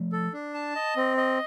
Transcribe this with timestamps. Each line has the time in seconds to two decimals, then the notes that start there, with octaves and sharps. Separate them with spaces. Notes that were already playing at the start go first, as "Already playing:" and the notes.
Already playing: F3 A3
0.12 A4
0.33 D4
0.54 A5
0.75 D#5
0.96 C4
1.17 D#5